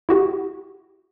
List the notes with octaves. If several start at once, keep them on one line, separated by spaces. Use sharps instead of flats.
E4 F#4 G4